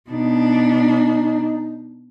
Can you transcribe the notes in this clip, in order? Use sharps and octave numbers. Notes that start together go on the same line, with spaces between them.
B2 D4 D#4